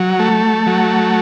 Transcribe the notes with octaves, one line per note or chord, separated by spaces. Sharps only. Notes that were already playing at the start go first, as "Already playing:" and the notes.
Already playing: F#3
A3
F#3